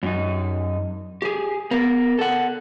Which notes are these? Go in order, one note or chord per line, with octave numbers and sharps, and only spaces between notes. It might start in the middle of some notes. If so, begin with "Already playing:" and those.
F#2 D#4
G4 G#4
B3 A#4
A4 F#5